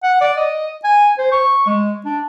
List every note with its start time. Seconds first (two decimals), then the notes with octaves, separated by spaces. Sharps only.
0.03 F#5
0.21 D5
0.37 D#5
0.84 G#5
1.18 C5
1.32 C#6
1.67 G#3
2.05 D4